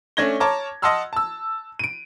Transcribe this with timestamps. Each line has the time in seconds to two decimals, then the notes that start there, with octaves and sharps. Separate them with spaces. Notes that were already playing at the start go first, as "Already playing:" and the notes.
0.17 A3 C#4 D4 G#6 A#6 G7
0.40 C#5 A5 A#5 D6 F6
0.82 D#5 F#5 A5 C6 E6 F6
1.13 A5 E6
1.79 D7 D#7